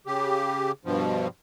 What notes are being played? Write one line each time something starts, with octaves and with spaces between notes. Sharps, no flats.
C#3 G4
G2 B2 F3